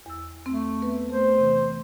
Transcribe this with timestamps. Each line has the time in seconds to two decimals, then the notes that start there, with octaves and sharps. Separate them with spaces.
0.06 E2 E6
0.46 A3 C4
0.81 B3 B4
1.10 A3 C5
1.38 C3 E3